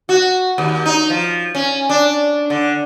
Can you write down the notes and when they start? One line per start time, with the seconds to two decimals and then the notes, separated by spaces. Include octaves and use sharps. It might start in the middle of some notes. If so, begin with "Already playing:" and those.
0.09 F#4
0.58 D#2
0.86 D#4
1.10 F3
1.55 C#4
1.90 D4
2.50 D3